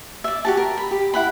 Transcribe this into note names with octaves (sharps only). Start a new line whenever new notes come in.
D5 E5
F#4 G4 A5
A#4
B5
G4
E4 F#5 B5